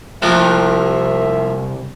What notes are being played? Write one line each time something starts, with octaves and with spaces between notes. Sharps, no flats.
C2 F3 A3 A#3 E5